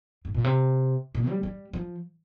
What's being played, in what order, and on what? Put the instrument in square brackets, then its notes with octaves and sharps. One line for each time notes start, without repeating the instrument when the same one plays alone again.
[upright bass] G#2
A#2
C3
A#2
G3
G3
F3